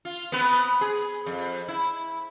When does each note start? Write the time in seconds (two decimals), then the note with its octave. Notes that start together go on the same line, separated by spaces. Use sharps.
0.05 F4
0.32 B3 C4 B4
0.81 G#4
1.26 F2
1.68 E4